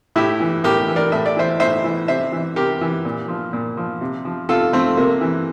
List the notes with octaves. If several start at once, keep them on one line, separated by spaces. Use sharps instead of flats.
A2 E4 G4
E3
A2 G4 A#4
E3
A#4 D5
A2 E5
D5
E3 C5 E5
A2 C5 E5
E3
C3 C5 E5
E3
C3 G4 A#4
E3
A#2
F3
A#2
F3
C3
F3
C3 F4 A4
F3 A3 C4
C3 A#3
E3